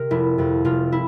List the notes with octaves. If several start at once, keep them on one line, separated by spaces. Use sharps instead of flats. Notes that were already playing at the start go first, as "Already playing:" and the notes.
Already playing: C3 A#4
F1 E4
F2 C3
F1 F4
E4